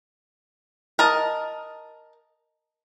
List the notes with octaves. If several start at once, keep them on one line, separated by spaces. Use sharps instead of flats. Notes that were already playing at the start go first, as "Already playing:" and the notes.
A#4 D#5 A5